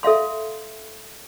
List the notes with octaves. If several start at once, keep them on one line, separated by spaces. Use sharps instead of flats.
A4 E5 F5 C6